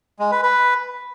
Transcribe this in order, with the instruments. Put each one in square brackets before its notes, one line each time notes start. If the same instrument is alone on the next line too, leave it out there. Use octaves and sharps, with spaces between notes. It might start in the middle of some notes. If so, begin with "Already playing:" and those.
[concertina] G#3
B4
B4